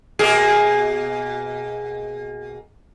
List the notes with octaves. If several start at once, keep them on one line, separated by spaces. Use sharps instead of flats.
B2 A#3 G#4